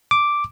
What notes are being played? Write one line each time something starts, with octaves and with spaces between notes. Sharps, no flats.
D6